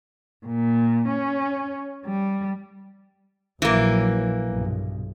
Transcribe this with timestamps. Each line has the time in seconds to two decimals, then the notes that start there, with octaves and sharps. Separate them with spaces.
0.46 A#2
1.09 C#4
2.06 G3
3.62 A#1 E3 F#3 A#3
4.47 B1 G2